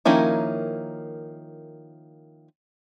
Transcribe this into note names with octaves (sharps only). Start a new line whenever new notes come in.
D#3 F3 A#3 C#4 E4